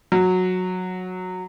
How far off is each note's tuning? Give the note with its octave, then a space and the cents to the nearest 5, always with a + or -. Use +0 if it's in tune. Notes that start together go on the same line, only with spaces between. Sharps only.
F#3 -10